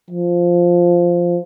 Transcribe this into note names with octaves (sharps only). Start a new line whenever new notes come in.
F3